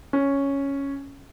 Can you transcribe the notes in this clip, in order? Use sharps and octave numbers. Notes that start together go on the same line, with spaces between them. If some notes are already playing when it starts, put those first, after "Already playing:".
C#4